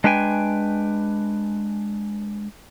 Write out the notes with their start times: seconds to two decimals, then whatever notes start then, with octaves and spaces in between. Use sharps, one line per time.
0.04 G#3 D4 B4 G5 G#5